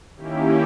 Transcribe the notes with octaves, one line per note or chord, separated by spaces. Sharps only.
D#3 A#3 C#4 E4 G4